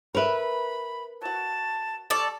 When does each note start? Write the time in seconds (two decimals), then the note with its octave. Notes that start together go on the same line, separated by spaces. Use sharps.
0.15 A#4 B4 C#5 E5 B5
1.22 F#3 F#4 A5
2.10 G3 A4 D5 C#6